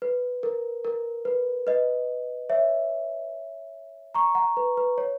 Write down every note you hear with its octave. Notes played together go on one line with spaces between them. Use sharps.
B4
A#4
A#4
B4
B4 D#5
C#5 E5
A#5 C#6
F#5 A#5
B4
B4
C#5